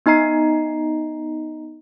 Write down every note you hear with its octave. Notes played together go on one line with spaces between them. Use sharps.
B3 D#4 D#5 A#5 C7